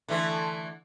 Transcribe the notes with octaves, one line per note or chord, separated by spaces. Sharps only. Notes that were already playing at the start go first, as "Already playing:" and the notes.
D3 E3 A3